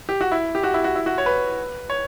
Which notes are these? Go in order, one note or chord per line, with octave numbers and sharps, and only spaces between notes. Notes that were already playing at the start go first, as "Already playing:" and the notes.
G4
F#4
E4
G4
F#4
E4
F#4
E4
F#4
C#5
B4
C#5